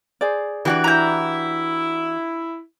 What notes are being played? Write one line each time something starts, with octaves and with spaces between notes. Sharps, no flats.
G#4 C5 D5
E3 D4 F#4 G4 D5
E4 A#5 G6